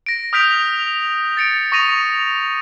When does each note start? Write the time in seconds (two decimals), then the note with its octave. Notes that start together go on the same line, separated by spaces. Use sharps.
0.06 A#6 D7
0.33 D#6 F6 G6 B6 D7 F7
1.37 A6 C#7 D7
1.72 C#6 D#6 A#6 D#7 F7